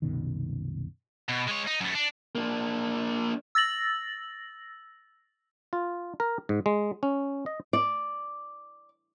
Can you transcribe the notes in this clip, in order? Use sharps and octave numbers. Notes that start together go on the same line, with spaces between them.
C2 F#2 B2 D#3
B2
G#3 C#5
D#4
F#2 A3
D4
A#3 D4
E6 A6 A#6 F#7
F4
A#4
G#2
G#3
C#4
D#5
D5